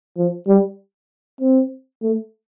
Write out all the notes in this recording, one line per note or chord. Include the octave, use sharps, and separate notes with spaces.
F3
G3
C4
A3